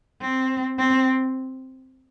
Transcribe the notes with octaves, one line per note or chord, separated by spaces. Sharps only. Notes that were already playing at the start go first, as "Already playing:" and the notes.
C4
C4